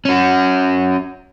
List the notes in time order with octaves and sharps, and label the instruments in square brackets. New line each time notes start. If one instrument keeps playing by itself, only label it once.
[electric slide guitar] C#4 F#4